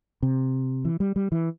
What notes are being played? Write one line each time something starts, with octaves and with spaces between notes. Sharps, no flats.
C3
E3
G3
G3
E3